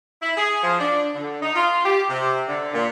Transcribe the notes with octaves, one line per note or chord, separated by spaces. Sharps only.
E4
G#4
F3
D4
D3
D#4
F4
G4
C3
D3
A#2